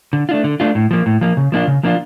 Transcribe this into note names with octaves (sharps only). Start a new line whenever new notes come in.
D3
A3 D4 F4
D3
A3 D4 F4
A2
F3 A#3
A2
F3 A#3
C#3
F3 A#3 D4 F4
C#3
F3 A#3 D4 F4